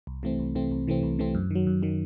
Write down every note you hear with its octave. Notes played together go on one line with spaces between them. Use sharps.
C2
C3 E3 A3 C4
C2
C3 E3 A3 C4
C2
C3 E3 A3 C4
C2
C3 E3 A3 C4
F#2
D#3 F#3
F#2
D#3 F#3